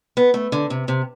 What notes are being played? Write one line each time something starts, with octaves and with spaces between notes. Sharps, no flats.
B3
A3
D3
C3
C3